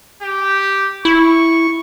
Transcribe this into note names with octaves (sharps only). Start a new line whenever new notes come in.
G4
E4 C#6